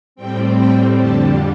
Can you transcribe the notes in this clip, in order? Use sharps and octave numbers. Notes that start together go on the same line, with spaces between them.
A2 G3 C4 G5
G5
F2 D3 G3 A5